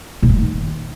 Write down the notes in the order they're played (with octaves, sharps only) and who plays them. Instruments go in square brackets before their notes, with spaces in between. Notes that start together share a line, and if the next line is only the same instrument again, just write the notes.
[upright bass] A#2
G2
D#3